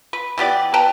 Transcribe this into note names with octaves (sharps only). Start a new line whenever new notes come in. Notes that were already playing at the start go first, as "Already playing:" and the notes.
B4
E3 B3 G4 D5
B4 G5 A5 A#5